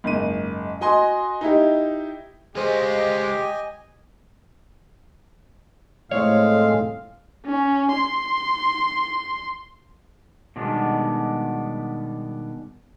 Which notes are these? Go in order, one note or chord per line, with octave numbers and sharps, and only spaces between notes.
F#1 G#2 D#7
F#4 D#5 G#5 C6
D#4 E4 G4
G#3 F4 G4 G#4 C5 D#5 G#5
A2 G#3 C4 G#4 C#5 F5
C#4
C6
B2 D#3 G3 G#3 B3 D4